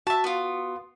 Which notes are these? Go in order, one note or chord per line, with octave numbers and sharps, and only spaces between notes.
F#4 E5 A5
B3 F4